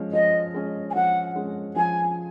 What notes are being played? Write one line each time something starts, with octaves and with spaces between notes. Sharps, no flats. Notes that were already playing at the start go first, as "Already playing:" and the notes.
Already playing: F3 G#3 C#4
F3 D#5
G#3 C#4
G#5
F3 F#5
G#3 C#4
F3 G#5